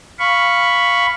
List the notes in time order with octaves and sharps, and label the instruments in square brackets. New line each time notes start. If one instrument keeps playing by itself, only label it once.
[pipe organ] F5 B5 C#6